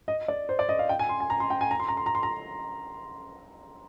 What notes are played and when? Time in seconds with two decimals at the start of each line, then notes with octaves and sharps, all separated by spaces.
0.08 D#5
0.28 D5
0.49 C5
0.59 D5
0.69 D#5
0.79 F5
0.89 G5
0.99 G#5
1.09 C6
1.20 G#5
1.30 A#5
1.40 C6
1.50 G5
1.61 G#5
1.71 A#5
1.80 C6
1.88 A#5
1.97 C6
2.06 A#5
2.15 C6
2.23 A#5